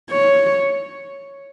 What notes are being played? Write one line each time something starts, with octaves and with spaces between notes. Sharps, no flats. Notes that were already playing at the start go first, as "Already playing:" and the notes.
C#5